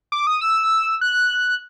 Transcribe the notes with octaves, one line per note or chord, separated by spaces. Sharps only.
D6
D#6
E6
F#6